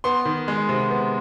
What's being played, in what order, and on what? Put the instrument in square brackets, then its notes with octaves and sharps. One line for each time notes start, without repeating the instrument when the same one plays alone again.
[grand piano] B3 C6
D#3
G#3
C3
B3